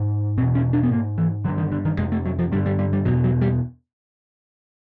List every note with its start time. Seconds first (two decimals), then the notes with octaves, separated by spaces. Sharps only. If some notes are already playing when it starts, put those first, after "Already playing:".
Already playing: G#2
0.38 B2 C4
0.42 E2
0.55 C#4
0.73 D4
0.83 B3
0.91 G#2 A#3
1.18 E3
1.44 D3 F#3
1.48 G2
1.58 D#3
1.72 D3
1.85 D#3
1.98 F2 C3 G#3
2.12 A3
2.25 F#3
2.39 F3
2.52 G2 G3
2.55 D3
2.66 G3
2.79 G3
2.93 G3
3.05 E2 B2 F#3
3.24 F#3
3.42 G3